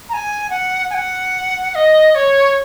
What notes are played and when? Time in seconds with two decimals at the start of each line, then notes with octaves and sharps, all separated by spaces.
0.09 A#5
0.13 G#5
0.50 F#5
0.90 G#5
0.94 F#5
1.70 F#5
1.75 D#5
2.11 D#5
2.15 C#5